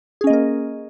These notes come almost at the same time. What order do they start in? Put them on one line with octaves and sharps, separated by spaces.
G#4 C#4 D#5 A#3 A#4